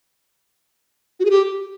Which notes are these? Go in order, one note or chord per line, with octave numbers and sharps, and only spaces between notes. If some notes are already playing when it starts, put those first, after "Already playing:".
F#4
G#4
G4